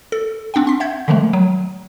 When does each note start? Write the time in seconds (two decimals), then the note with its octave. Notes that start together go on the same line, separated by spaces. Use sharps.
0.12 A4
0.54 C4 D4 F#5 G5
0.67 C6 B6
0.80 E5 F#5 G6 G#6
1.08 D3 D#3 F3 G#3 A3
1.33 F#3